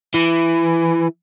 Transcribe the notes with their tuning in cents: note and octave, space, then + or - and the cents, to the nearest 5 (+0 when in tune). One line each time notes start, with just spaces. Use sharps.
E3 +15